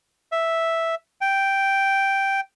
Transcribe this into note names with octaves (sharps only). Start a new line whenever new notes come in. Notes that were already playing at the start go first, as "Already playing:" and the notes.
E5
G5